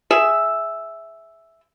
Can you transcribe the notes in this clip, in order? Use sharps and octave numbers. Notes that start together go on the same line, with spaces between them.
G#4 E5